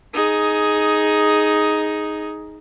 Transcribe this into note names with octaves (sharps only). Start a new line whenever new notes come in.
D#4 G#4